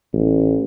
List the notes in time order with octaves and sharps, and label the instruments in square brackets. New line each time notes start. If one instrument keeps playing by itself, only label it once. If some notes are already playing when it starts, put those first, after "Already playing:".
[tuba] A1